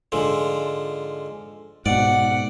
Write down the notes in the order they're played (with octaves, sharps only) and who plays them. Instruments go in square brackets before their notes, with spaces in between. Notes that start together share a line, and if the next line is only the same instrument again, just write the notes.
[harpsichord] G#2 D3 F3
[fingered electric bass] G#2 B2 [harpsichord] D5 [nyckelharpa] F#5